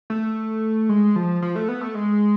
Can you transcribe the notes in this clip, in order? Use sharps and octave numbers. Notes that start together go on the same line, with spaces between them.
A3
G#3
F3
F3
A3
B3
A3
G#3